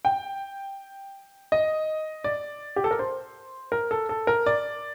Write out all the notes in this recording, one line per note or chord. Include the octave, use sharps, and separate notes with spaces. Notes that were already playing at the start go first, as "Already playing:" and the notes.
G5
D#5
D5
G4
A4
A#4
C5
A#4
A4
A4
A#4
D5